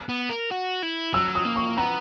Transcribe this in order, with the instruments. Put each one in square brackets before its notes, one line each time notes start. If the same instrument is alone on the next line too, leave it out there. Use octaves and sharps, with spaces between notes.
[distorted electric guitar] B3
A#4
F#4
E4
[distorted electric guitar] F#3 [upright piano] E6
[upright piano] D#6
[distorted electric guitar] A#3
[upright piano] C#6
[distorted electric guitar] B3 [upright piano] A#5